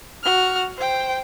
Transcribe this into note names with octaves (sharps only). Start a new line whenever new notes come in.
F#4 F6
C5 G5